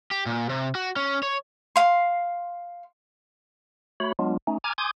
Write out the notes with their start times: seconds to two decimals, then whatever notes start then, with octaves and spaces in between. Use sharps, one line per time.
0.11 G4
0.26 A#2
0.49 C3
0.75 F#4
0.96 C#4
1.23 C#5
1.76 F5 C6
4.00 A3 F#4 C#5 B5
4.19 F#3 G#3 B3 D4 F4
4.47 A3 C#4 D#4
4.64 G#5 A#5 D6 F6 G#6
4.78 G#5 C6 D6 D#6 G6 G#6